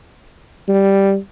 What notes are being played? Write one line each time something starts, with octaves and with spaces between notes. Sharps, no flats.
G3